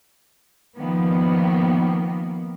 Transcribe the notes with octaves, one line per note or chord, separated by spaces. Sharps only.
D#3 F3 A#3 B3